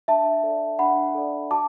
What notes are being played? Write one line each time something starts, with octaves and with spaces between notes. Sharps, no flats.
D4 E5 A5
A4 D5
D4 F#5 B5
A4 D5
F#4 A5 D6